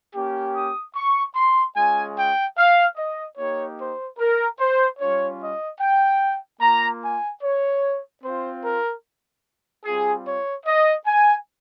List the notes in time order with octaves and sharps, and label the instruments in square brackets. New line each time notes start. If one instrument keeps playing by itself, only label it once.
[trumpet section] A#3 C#4 G4
D#6
C#6
C6
G#3 C#4 F4 G#5
G5
F5
D#5
A#3 D#4 G4 C#5
C5
A#4
C5
G3 C#4 F4 C#5
D#5
G5
A#3 F4 A#5
G#5
C#5
C4 F4 C5
A#4
G3 C4 F4 G#4
C#5
D#5
G#5